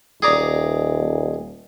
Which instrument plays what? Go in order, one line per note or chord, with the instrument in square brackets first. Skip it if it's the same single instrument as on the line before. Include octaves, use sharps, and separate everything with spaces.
[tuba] D#1 [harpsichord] G#4 D5 A#5